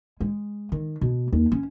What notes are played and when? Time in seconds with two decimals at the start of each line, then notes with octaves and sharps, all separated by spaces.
0.20 G#3
0.72 D#3
1.01 B2
1.33 D#2
1.52 C#4